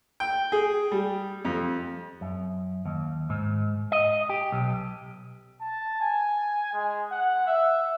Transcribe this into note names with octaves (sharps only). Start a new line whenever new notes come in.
G5
G#4
G3
F2
F#2
D#2
G#2
D#5
G4
B1
A5
G#5
G#3
F#5
E5